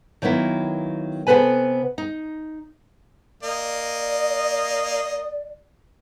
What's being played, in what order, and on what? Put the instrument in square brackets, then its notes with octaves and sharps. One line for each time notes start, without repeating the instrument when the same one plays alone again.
[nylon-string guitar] D#3 F#3 A#3 B3 E4
C3 B3 F#4 A4 B4 G#5
D#4
[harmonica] A#3 D#5 [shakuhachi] D5